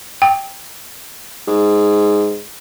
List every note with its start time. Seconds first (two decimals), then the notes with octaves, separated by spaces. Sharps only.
0.22 G5
1.48 G#2